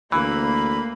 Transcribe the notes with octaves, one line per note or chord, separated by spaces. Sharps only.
D2 E3 A#3 B5